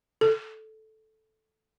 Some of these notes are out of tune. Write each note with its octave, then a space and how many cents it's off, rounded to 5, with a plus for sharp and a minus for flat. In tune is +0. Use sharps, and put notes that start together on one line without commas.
A4 -10